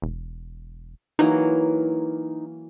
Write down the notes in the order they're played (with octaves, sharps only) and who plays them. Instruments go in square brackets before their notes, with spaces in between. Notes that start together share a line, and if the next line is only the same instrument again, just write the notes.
[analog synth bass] E1
[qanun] E3 F#3 A#3 [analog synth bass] D#4